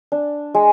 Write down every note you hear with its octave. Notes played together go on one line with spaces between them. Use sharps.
D4
G#3